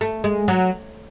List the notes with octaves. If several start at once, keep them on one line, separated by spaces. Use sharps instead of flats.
A3
G#3
F#3